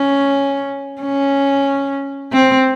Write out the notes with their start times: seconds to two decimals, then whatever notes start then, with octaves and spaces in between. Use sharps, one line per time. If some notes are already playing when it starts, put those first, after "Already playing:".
Already playing: C#4
1.02 C#4
2.33 C4